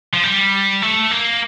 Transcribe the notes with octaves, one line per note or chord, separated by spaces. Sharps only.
F3
G3
A3
A#3